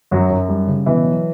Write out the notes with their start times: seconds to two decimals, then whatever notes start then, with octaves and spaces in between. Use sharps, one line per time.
0.11 F#2 F#3 F#4
0.30 F#2
0.49 G3
0.67 C#3
0.86 B2 E3 E4
1.05 F#3